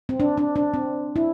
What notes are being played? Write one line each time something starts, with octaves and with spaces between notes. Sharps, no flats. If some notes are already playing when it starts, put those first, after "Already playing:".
C4
D4
D4
D4
C4
E4